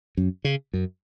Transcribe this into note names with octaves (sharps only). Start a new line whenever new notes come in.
F#2
C#3
F#2